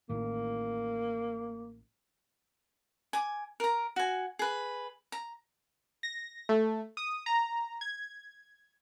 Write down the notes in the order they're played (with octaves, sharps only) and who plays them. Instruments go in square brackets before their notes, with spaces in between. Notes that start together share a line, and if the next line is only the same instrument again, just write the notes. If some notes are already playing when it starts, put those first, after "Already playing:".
[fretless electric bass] A1 A2 D#3 [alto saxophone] A#3
[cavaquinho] G#5 D6
A#4 A#5
F#4 G#5
G#4 B4
A#5
[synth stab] A#6
A3
D#6
A#5
G#6